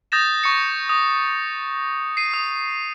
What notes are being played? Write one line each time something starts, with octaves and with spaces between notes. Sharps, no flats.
D#6 G6 A6 A#6 E7
C#6 C#7
D#6
C7 D#7
D#6